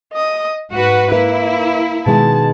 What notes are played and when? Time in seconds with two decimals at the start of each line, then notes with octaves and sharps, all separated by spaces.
0.13 D#5 D#6
0.72 G#2 F#4 B4 F#5
1.12 A#3 E4 B4
2.06 B2 D#3 G#3 A5